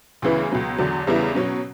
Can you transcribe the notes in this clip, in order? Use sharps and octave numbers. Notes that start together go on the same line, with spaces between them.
D2 C#3 E3 B3 E4
C#2 B2 F#3
E2 D3 F#3
E2 C#3 G3 B3 E4
B2 F#3 C#4